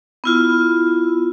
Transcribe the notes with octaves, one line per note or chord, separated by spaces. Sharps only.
B3 E4 F4